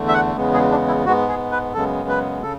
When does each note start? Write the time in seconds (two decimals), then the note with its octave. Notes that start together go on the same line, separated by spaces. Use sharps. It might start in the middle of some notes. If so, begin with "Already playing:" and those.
Already playing: E2 D3 A3
0.08 E5
0.14 F#5
0.36 E2 C#3 G#3 B3
0.54 G#4
0.71 D4
0.88 E4
1.05 G#2 G#3 B3 F#4
1.28 G#4
1.51 B4
1.73 F#2 C#3 G#3 B3 A4
2.09 B4
2.42 C#3 A4